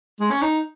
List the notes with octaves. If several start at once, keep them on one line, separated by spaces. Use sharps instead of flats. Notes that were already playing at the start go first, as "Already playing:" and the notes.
G#3
C#4
D#4